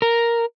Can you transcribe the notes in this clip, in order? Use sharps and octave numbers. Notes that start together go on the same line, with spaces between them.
A#4